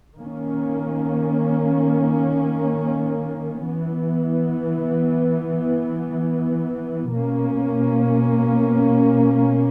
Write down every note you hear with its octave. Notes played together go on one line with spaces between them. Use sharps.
D#3 A#3 C#4
E3 B3
B2 A#3 C#4